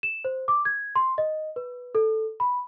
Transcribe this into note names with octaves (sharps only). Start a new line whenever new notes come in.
E7
C5
D6
G#6
C6
D#5
B4
A4
B5